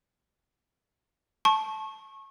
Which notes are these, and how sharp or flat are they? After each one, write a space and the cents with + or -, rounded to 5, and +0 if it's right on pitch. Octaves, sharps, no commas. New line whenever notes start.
A5 -20 C#6 -25